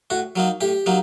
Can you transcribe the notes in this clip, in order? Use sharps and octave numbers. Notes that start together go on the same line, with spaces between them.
A2 F#4
F#3 A#3 D#4
A2 G4
F#3 A#3 D#4